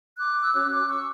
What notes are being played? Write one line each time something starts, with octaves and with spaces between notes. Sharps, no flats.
D6 F#6
E6
C#4 F#4 C#5 D6 F#6
D6 F#6
C#6 E6